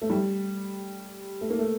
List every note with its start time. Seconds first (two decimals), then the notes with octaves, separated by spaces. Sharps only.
0.02 A3
0.10 G3
1.41 A3
1.50 A#3
1.59 A3